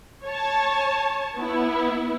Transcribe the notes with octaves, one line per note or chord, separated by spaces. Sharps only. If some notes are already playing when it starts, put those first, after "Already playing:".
C#5 A5
B3 E4